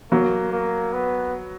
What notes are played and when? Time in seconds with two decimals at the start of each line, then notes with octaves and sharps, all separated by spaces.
0.11 F#3 A#3
0.52 A#3
0.93 B3